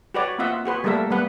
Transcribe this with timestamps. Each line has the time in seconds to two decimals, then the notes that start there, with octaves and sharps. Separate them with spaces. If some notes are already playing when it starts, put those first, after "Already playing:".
0.14 F#4 G4 B4 C#5 D5
0.38 A#3 C4 F4 D#5 E5 F#5
0.65 F#4 G#4 B4 C5
0.84 G3 A3 A#3 A4 A#4 E5
1.10 G3 A#3 B3 B4 F#5